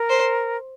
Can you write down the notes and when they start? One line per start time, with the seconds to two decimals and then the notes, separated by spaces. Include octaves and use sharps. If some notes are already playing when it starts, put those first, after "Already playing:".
Already playing: A#4
0.10 C5